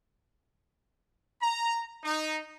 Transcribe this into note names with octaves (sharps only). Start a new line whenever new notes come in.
A#5
D#4